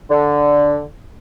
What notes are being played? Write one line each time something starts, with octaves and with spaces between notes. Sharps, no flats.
D3